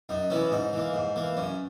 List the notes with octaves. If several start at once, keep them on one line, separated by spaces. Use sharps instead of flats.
F#2 D#4
E3 B3 C#4 E4
G#2 D#4
E3 A#3
G#2
E3 A#3
F#2 C#4